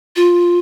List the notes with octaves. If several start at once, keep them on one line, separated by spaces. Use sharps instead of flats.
F4